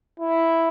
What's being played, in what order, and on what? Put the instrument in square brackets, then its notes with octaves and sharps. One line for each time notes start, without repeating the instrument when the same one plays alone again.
[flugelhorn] E4